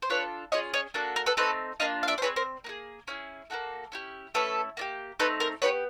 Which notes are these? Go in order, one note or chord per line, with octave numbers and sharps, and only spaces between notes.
C5
D4 F4 A4 B4 C#5
C#4 F4 G#4 C#5 D#5
C#5 D#5
A#3 D4 F#4 A4
A#4
A4 B4
A3 C4 D#4 A4 B4
A#3 D4 F4 D#5 F5
F5
D5 E5
C5
C4 D#4 G#4 B4 C#5
A#4 C5
A#3 D#4 G#4
C#4 E4 G#4
A#3 D#4 F#4 A4
C#4 E4 G4
A3 C#4 E4 A4 B4
A#3 D4 G4
A3 C4 D#4 A4 B4
A#4 C5
B3 D#4 G4 B4 C#5